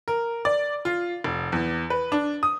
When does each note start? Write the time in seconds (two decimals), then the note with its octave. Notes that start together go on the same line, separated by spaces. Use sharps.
0.08 A#4
0.45 D5
0.85 F4
1.24 F1
1.52 E2
1.90 B4
2.12 D4
2.43 D#6